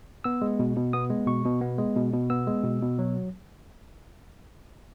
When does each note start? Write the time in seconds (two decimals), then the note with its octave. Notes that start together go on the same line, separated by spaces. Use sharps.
0.24 B3 E6
0.42 G#3
0.59 B2
0.76 B2
0.93 B3 D#6
1.10 G#3
1.27 B2 C#6
1.45 B2
1.61 B3
1.78 G#3
1.96 B2
2.13 B2
2.30 B3 E6
2.47 G#3
2.64 B2
2.82 B2
2.99 F#3